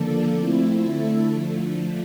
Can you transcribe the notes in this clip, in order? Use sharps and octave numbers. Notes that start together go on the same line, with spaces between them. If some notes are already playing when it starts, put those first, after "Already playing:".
Already playing: D3 F3 A#3 D4 A4
F3 A3 C4 E4
D3 A3 E4 A4
D3 F3 A3